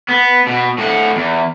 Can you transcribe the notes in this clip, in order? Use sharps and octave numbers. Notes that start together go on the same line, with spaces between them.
B3
B2
A2 F#5
E2